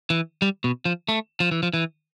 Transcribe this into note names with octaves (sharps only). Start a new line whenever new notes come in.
E3
G3
B2
F3
A3
F3
E3
F3
E3